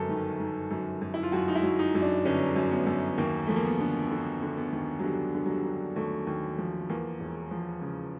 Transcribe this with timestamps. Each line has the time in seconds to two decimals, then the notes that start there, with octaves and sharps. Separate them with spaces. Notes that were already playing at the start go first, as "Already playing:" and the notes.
Already playing: G1 F#2 A4 A#4
0.09 D#3
0.39 D#3
0.71 F#2
1.01 F#2
1.14 E4
1.23 F4
1.32 F#2 F#4
1.48 D#4
1.56 E4
1.63 F#3
1.79 D#4
1.95 F#2
2.02 D4
2.25 G1 C#4
2.56 F#2
2.71 B3
2.86 F#2
3.18 D#2 A#3
3.46 F3 A3
3.56 A#3
3.65 B3
3.80 D3
4.11 D3
4.42 D3
4.57 B3
4.73 D#2
4.99 F#3
5.03 D3 G3
5.34 D3
5.46 F#3
5.50 G3
5.65 D3
5.96 D#2 A3
6.27 D#2
6.58 F3
6.90 E2 A#3
7.20 E1
7.51 F3
7.82 C#3